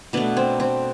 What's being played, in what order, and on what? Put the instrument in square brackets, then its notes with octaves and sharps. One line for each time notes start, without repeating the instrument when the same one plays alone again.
[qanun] B2 A3 B3 D4
C4
C4